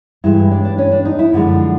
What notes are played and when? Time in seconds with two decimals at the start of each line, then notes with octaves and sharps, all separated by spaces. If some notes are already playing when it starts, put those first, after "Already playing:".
0.24 G2 E3 G#3 E4
0.51 D4
0.65 D4
0.78 C#4
0.91 D4
1.05 D#4
1.19 E4
1.32 F#2 D3 F3 G#3